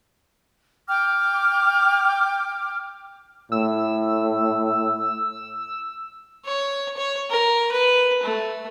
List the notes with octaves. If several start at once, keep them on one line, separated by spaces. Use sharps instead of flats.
G5 D6 F6
A2 E6
C#5
C#5
A#4
B4
A3